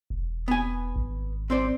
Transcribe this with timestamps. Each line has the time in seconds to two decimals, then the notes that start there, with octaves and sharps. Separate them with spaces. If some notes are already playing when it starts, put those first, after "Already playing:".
0.10 E1
0.48 B3 G#5
0.96 G#1
1.50 C4 C5 D5